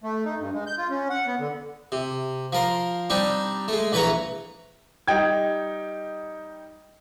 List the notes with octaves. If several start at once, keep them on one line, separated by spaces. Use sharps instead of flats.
A3
D#4
G2
G#3
G6
F4
C#4
F#5
B3
D3
C3
F3 A#4 C6
G3 C4 D4 D#4
G#3 A3
A#1 E3 B4 C#5 A#5
G3 D#4 G5 G#6